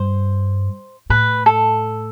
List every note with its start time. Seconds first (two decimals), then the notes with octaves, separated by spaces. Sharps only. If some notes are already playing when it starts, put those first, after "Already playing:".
Already playing: G2 C5
1.10 A2 B4
1.46 A4